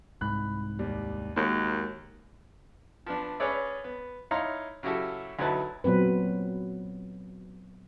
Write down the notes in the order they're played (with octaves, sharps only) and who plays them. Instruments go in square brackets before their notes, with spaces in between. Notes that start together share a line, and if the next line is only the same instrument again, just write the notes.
[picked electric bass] C2 G#2 [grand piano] B5 F#6
[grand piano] D#2 G3
[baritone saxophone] D#2 [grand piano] G#3 F#4 A#4
[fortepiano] F3 B3 D4
C#4 G#4 B4 C#5 D5 E5
B3
D#4 E4 C#5 F5 A#5 C6
C#3 F#3 E4 F#4 G4 A4
D2 F#3 D#4 E4 B4 A5
[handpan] A#2 F#3 B3 C4 B4